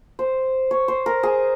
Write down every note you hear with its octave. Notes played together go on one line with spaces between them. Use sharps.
C5
C#5
C5
A#4
G#4